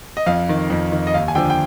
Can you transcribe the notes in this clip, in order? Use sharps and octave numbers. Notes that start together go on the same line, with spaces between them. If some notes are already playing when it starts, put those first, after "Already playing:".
D#5
F2 F5
D#3
F2
D#3
D#5
D#2 F5
G#5
D3 F3 G5
G5